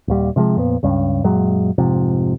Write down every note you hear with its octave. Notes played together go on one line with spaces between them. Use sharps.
D#1 D#2 G3
C3 F3 G3 G#3
F2 A#2 B3
C#2 G2 C#4
F#2 A#2 F#3 G#3
F1 G#2 C3 F3